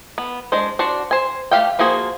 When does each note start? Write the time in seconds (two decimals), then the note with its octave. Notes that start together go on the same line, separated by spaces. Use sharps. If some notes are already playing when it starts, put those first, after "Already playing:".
0.18 B3
0.52 G#3 D4 C5
0.79 D4 F#4 C5 D5
1.11 C5 G#5
1.51 A3 G4 F5 G5
1.79 F3 A#3 F#4 G#4 C5